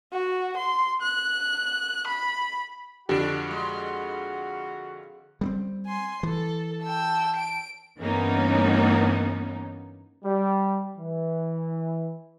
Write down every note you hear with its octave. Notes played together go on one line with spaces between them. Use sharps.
F#4
C6
F#6
B5
F2 D3 D4 F#4 G4 F5 F#5
G#3
G3 B3 C4
G#5 C6
E3 A4
G5 A5 E6
D7
G2 E3 A#3 B3 C#4 D#4
G3
E3